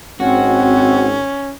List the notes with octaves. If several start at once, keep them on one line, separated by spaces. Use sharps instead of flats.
G#1 G#2 C4 C#4 F#4